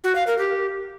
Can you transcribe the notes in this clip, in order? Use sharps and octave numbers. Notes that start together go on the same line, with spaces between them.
F#4
F5
A#4
G4